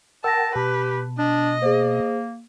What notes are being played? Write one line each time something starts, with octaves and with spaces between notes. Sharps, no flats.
A#4 F#5 G5 A5 E6 A#6
B2 G4 B4 A5
D4 D#5
A#3 G#4 C5